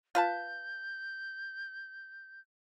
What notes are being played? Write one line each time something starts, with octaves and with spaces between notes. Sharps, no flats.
F4 B4 A5 G6